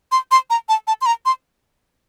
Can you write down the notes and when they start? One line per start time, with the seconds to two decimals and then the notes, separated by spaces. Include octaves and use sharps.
0.12 C6
0.31 C6
0.50 A#5
0.69 A5
0.87 A5
1.01 C6
1.06 A#5
1.26 C6